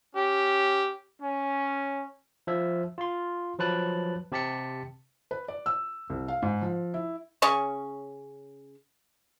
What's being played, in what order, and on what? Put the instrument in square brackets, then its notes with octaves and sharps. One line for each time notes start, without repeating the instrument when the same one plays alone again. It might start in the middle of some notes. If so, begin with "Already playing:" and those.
[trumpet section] C#4 G4
C#4
[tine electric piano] F3 E5
F4 C6
F3 F#3 B4 A5 F#6
C3 G4 A5 B6 C#7
[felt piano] B4
D5
E6
C2
F5
G#2
F3
E4
[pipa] C#3 C#4 C#6